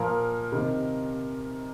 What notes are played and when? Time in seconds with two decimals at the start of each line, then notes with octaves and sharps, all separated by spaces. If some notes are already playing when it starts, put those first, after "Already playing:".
Already playing: A#2 F3 A#4
0.52 C3 D#3